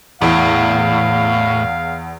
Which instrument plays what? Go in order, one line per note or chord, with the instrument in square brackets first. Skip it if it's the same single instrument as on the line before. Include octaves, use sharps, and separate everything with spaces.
[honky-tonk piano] E2 [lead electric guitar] A2 [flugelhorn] F5